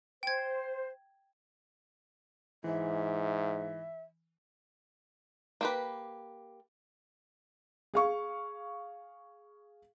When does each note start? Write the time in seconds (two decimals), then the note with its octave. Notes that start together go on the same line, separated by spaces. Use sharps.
0.23 C5 G5 G#6
2.64 G#2 E3 E5
5.61 A#3 G4 B4
7.94 G#4 F5 C#6